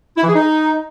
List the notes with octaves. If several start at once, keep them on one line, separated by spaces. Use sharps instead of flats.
E4
E3
G#4
D#4